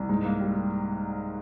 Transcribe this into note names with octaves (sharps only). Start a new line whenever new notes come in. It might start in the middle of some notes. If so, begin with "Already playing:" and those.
Already playing: C2
G#2
A#3
G3